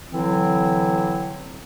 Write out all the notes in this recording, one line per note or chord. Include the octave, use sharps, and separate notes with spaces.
D3 E3 F#3 C4 E4